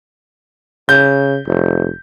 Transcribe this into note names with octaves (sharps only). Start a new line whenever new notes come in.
C#3 G6
F1